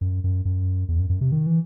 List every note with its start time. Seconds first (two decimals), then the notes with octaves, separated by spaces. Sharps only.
0.01 F#2
0.24 F#2
0.45 F#2
0.88 E2
0.99 F#2
1.09 F#2
1.21 C3
1.32 D#3
1.46 E3